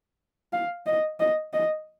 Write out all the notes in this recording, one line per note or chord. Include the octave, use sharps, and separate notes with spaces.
F5
D#5
D#5
D#5